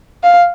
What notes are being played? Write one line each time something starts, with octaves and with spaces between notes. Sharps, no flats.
F5